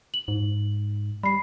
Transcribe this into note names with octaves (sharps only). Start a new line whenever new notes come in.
F#7
G#2
G3 B5 C7